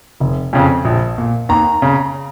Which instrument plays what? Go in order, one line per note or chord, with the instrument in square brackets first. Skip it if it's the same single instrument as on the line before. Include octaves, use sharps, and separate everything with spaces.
[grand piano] F1
F2 C#3
A#1
A#2
D#2 A#5
C#3